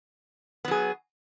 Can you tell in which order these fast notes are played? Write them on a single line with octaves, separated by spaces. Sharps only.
B3 F#3 G#4